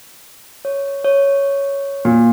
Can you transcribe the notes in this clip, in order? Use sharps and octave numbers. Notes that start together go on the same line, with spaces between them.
C#5
C#5
A#2